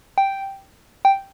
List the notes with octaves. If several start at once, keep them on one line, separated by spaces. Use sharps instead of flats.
G5
G5